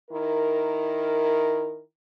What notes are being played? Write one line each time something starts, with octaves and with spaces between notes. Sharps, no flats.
D#3 E4 A#4